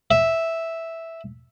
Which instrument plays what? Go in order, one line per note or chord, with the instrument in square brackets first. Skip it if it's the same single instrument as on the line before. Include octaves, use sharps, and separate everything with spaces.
[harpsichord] E5